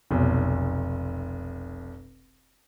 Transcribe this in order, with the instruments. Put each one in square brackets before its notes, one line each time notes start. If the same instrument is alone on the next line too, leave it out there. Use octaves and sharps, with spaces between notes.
[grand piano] F1 B1